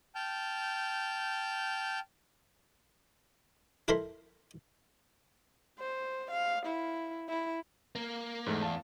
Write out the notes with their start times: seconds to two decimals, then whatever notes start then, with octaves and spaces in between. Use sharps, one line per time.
0.15 G5 A5 F6 G6
3.88 E4 A4 A#4 C5 B5 C6
5.79 C5
6.31 F5
6.66 E4
7.29 E4
7.95 A#3
8.47 E2 G#2 A3
8.63 F5 A5